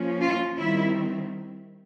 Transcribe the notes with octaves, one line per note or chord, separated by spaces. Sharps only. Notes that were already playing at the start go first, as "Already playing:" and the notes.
Already playing: F3 A#3 C#4
F4
D#3 G3 C4 E4